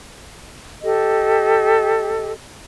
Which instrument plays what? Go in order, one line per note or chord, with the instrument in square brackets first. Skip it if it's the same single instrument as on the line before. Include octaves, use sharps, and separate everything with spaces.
[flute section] G4 A4 D#5